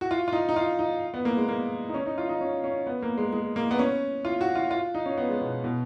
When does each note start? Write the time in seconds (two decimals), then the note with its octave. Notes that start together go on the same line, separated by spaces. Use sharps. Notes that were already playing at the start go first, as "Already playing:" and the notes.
0.01 F#4
0.11 F4
0.28 F4
0.33 D#4
0.49 D#4
0.56 F4
0.79 D#4
1.14 B3
1.25 A#3
1.37 G#3
1.49 A#3
1.89 D#4
1.94 C#4
2.06 D#4
2.18 F4
2.29 D#4
2.41 C#4
2.64 C#4
2.87 B3
3.03 A#3
3.18 G#3
3.33 G#3
3.56 A#3
3.71 B3
3.79 C#4
4.25 F4
4.41 F#4
4.55 F4
4.71 F4
4.95 D#4
5.06 C#4
5.18 B3
5.29 G#3
5.41 B2
5.64 B2